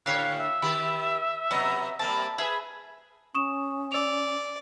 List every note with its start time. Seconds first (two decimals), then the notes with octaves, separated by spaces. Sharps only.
0.06 A2 D3 C#4 G4 C#5 F5 F#6
0.38 E5
0.62 D#3 G4 B5
1.51 C3 F#3 B3 D#5
1.99 G3 A#3 C4 A5
2.38 G#4 B4 E5
3.35 C#4 C#6 D#6 E7
3.92 D5 E6 F7